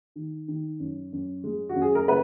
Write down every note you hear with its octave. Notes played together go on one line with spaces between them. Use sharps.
D#3
D#3
F#2
F#2
G#3
F#4
F#2
G#4
A#4
C#3 B4